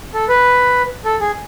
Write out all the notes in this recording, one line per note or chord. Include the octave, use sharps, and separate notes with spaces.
A4
B4
A4
G#4